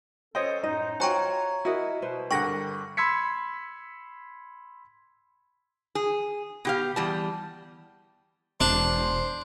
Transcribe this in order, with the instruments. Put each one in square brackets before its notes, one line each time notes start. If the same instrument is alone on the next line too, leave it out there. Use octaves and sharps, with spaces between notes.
[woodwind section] C#4 A4 [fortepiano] C5 [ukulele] C#5 D#5 G5
[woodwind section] F#2 A2 D#4 [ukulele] D#5
[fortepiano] F4 F#4 [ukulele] C5 G5 [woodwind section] C#5 [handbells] G#5 A#5 C#6
[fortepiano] E4 [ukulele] F#4 A#4 D#5
[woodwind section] B2 [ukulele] B4 C5
[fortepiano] G2 D3 F#5 [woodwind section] A#4 [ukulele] G5 [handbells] C#6 A#6
[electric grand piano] B5 C6 E6 G#6 B6 C#7
[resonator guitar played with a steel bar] G#4
B2 G4 F5
E2 G3 A5
[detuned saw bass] E1 [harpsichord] D4 [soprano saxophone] C5